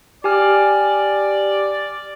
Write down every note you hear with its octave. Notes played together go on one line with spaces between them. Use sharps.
G4 D5 G#5 F6